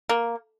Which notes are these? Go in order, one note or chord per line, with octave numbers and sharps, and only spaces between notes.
A#3